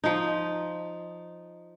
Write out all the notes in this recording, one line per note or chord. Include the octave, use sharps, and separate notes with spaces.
F3 D#4